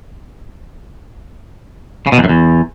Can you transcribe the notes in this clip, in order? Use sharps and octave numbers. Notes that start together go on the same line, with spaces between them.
C#3
B2
E2
F#2
E2